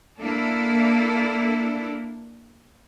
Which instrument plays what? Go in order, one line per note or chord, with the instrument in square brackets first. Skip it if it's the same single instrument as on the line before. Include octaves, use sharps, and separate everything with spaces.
[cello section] A#3 D4 E4 A4